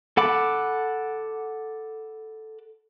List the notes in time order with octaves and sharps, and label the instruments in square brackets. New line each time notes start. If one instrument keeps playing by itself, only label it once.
[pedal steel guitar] A4 F#5 B5 D6